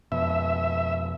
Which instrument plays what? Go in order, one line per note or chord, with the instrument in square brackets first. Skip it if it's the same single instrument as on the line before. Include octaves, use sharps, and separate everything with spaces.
[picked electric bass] F2 B2 [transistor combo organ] E5